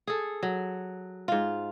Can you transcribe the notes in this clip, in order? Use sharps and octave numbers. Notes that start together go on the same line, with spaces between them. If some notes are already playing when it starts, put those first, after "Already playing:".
G#4 A4
F#3
G#2 F4